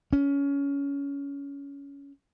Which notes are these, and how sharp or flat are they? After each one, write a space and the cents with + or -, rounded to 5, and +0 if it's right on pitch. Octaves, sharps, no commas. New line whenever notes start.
C#4 +20